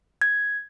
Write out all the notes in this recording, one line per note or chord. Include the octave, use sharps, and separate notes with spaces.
G#6